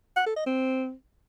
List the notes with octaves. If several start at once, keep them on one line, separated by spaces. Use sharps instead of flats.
F#5
A4
D#5
C4